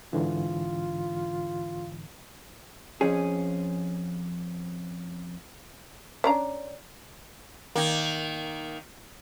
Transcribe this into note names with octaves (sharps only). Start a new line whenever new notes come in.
G#2 D3 E3 F4
F2 F3 C#4 G#4
C#4 D4 A#5
D#3 A#3